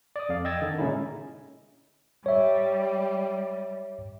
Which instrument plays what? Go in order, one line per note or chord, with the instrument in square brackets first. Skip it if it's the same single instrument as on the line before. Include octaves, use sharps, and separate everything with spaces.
[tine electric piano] D5 D#6
F2 F5
D#5 G5 D#6 E6 G#6 A6
D3 D#3
A#2 C#3 G#3 C#4 D#4 E4
[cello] G3 [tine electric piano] C#5 E5